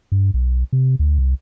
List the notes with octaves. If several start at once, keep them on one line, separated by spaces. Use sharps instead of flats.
G2
B1
C3
D2
C2